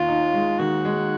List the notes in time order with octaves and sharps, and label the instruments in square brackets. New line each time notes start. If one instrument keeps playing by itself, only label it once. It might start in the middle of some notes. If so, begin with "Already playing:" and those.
Already playing: [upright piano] D#2 [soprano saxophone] F4
[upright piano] D#4
G#3
[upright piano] D#3 [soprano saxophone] F#4
[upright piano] G#3